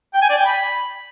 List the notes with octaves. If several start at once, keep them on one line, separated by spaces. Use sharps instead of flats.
G5
G#5
D5
G5
B5